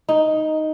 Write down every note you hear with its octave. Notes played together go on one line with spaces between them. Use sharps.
D#4